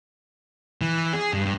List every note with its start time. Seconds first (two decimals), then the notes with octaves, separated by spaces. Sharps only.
0.81 E3
1.13 G#4
1.33 G2